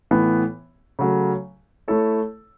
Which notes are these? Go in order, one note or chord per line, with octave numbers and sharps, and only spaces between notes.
A2 E3 B3
C#3 F#3 A3 C#4
A3 E4 A4 C#5